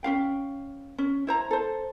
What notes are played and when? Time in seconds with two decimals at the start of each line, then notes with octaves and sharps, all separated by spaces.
0.03 C#4 F4 F5 G5
0.98 C#4
1.27 E4 C5 A#5
1.51 A4 C5